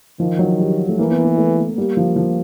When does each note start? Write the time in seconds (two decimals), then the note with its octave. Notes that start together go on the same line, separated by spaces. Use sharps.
0.20 D#3 F3
0.39 F#3
0.60 G3
0.89 A3
0.99 E3 A#3
1.11 B3
1.25 A#3
1.38 A3
1.58 A3
1.78 G3 A#3
1.97 F3
2.16 F3